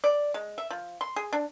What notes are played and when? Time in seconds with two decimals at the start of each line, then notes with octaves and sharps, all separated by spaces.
0.04 D5
0.34 G#3
0.58 E5
0.70 F3
1.01 C6
1.16 G#4
1.33 D4